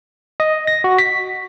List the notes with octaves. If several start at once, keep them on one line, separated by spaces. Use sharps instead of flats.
D#5
A#6
F#4
B6